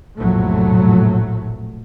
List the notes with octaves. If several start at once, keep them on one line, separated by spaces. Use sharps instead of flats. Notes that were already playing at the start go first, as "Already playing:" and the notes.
F1 A#1 A2 F#3 A3